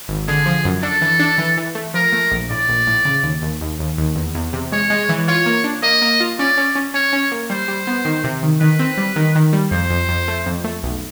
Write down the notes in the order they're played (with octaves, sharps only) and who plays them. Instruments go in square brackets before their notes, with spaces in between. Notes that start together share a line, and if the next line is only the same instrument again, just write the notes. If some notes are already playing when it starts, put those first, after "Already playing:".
[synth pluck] G#1
[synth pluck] D3 [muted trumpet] G#4
[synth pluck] F3
F#2
[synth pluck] D4 [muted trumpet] A4
[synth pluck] E3
D4
E3
E3
A3
[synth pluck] F3 [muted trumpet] A#4
[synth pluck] A3
A#1
[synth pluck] A2 [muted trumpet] D5
[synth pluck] A#1
A2
C#3
D#2
D#2
D#2
D#2
D#2
E2
E2
C3
[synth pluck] G#3 [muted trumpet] C#5
[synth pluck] G#3
E3
[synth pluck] F4 [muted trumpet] C#5
[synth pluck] A#3
D4
[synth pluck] A#3 [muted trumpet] D#5
[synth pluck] A#3
F4
[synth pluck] C#4 [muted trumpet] D5
[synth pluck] C#4
C#4
[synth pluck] C#4 [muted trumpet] C#5
[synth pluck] C#4
A#3
[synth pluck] G3 [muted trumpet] C5
[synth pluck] G3
B3
D#3
C3
D#3
[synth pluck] D#3 [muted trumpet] B4
[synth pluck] C4
G3
D#3
D#3
G3
[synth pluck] F2 [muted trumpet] C5
[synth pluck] F2
F2
A3
F2
A3
B1